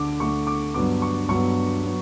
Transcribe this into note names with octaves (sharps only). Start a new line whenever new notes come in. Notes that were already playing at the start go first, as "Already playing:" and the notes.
Already playing: D2 D3 A3 D6
D2 D3 A3 C#6
D6
G2 F#3 B3 D6
C#6
G2 F#3 B3 C#6
F#3 B3